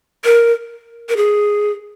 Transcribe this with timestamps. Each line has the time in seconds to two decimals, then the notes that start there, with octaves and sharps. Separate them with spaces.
0.24 A#4
1.09 A#4
1.17 G#4